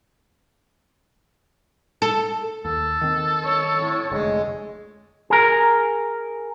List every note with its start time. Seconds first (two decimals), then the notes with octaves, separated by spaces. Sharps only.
2.02 A4
2.65 D#2 A4
3.01 D#3 C4
3.43 C#5
3.78 A2
4.11 F1 D2 G#3
5.30 G#4 A#4